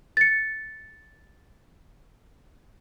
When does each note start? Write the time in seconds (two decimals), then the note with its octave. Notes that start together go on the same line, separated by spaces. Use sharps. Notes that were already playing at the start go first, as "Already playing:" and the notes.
0.17 A6 C#7